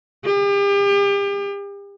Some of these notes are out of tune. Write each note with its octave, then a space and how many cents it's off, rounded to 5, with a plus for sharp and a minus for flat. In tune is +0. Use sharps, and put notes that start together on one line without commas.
G4 +40